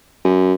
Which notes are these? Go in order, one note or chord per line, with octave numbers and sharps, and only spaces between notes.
F#2